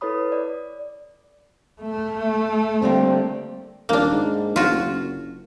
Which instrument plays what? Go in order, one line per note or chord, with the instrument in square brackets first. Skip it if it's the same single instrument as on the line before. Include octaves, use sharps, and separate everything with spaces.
[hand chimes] E4 A4 B4 C#5 B5 D#6
D5
[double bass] A3
[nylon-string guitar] D3 G3 A#3 [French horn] C4
[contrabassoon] D#1 [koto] A#3 D4
[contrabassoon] G#2
[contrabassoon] D1 [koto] F4 F#4
[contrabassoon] F#1